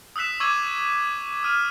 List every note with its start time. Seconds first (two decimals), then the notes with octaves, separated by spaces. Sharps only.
0.16 D#6 E6 F#6 B6 E7
0.40 C#6 D6 E6 G#6 D#7
1.43 D#6 F6 D#7